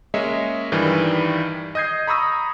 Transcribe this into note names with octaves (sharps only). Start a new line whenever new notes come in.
G#3 A#3 C#4 C#5 D#5 E5
G2 D#3 E3 G3
D#5 D#6 G6 G#6 C7
A#5 B5 C#6 D#6 E6 A#6